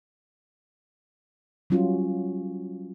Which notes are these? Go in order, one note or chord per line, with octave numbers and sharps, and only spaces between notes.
F#3 G3 C#4 F4 F#4